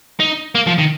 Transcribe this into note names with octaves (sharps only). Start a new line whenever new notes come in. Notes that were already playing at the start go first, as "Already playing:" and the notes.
D#4
A#3
F3
D#3